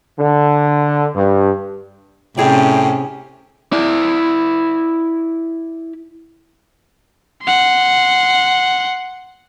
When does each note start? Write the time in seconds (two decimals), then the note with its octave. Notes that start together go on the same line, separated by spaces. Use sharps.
0.19 D3
1.15 G2
2.37 A2 C3 C#4 G#4 D5 G5
3.73 E4 D5
7.43 F#5 C6